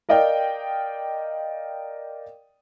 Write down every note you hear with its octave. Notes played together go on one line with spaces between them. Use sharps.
A#4 D5 D#5 F5 G5